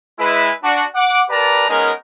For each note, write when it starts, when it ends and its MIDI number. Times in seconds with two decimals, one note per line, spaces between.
0.19 0.51 56
0.19 0.51 64
0.19 0.51 71
0.63 0.84 62
0.63 0.84 66
0.95 1.22 78
0.95 1.22 86
1.30 1.66 67
1.30 1.66 70
1.30 1.66 71
1.30 1.66 74
1.30 1.66 81
1.30 1.66 82
1.69 1.91 56
1.69 1.91 59
1.69 1.91 61
1.69 1.91 63
1.69 1.91 70